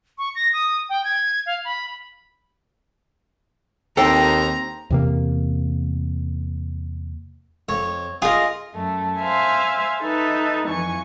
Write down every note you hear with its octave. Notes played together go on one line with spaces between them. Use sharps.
C#6
A#6
D#6
G5
G#6
F5
B5
D#2 C4 A4 G5 A#5
E2 C3 A#3
F2 C#5
F4 G#4 A#4 D#5
F#2 A3
C5 E5 F5 G#5
D#4 A4 B4 E5
F2 E3 G#5 C#6